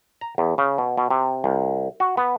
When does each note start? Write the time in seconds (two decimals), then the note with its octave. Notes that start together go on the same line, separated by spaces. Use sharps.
0.21 A#5
0.38 E2
0.58 C#3
0.78 B2
0.98 B2
1.10 C3
1.44 C2
2.00 F#4
2.17 B3